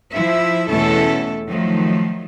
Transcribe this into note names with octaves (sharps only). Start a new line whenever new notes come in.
F3 E4 E5
E2 B2 A3 C#4 E4 A4
D#3 F3 F#3 A3